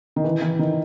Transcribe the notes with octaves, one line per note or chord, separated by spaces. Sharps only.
D#3
E3
E3
D#3